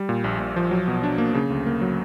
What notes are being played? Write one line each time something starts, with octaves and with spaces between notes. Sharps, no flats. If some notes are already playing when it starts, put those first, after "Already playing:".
Already playing: G3
A#2
A#1
A#1
F3
F#3
B2
D4
A#3
C#3
D2
A#3
F#3